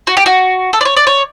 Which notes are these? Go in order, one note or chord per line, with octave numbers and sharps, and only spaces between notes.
F#4
G4
F#4
A4
D5
C#5
D5
C#5